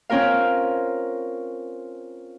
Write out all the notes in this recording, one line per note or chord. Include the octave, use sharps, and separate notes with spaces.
C4 C#4 F4 A#4 F5